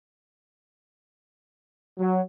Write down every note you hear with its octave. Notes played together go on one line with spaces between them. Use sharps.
F#3